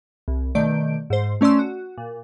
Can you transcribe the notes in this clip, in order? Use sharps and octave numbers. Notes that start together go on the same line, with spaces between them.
C2
B2 D#3 A3 D5 G6 D7
G#2 C5
A3 C#4 D5 C6 E6
F#4
A#2